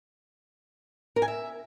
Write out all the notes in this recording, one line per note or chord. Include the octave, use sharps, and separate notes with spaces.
A#4
G#5
E5